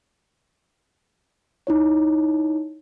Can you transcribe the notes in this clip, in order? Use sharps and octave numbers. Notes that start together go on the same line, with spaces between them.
D#4 E4 C#5